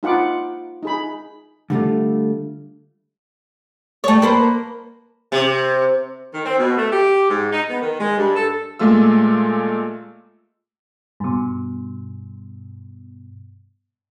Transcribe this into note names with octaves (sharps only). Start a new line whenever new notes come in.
D#4 F4 F#5 B5 D6
D#4 G#4 B5
D3 G3 A3 F4
A3 C#5
A#3 B4 C5
C3
D#3
C4
B2
A3
G4
G#2
D#4
B3
D#3
G#3
G2
A4
A#2 G#3 A3 F4 E6
G2 B2